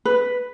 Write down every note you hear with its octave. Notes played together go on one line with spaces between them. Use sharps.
B4